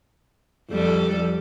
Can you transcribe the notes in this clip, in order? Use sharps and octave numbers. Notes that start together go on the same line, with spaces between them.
F2 G3 A4